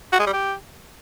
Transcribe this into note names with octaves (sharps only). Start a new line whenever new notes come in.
F#4
G#3
G3
G4